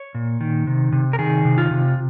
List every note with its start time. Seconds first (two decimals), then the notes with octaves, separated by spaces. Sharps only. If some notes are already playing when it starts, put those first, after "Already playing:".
Already playing: C#5
0.15 A#2
0.41 D#3
0.67 C3
0.92 C3
1.13 A#4
1.19 D#3 G#4
1.45 C3
1.58 F4
1.71 C3